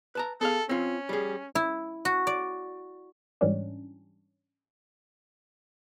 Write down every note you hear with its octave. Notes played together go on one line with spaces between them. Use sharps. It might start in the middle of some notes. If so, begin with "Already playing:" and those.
B4 A5 A#5
B3 G#4 A4 F5
C4 C#4 F4
G3 G#4
E4
F#4
D5
G#2 E3 G3 C#4 D4